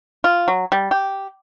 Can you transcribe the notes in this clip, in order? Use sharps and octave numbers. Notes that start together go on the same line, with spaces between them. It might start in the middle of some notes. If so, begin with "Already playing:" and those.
F4
F#3
G3
G4